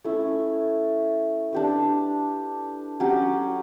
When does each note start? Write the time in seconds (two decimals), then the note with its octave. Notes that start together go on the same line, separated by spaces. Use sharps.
0.04 A3 C#4 E4
1.53 D4 G4 B4
3.00 F#3 C#4 G4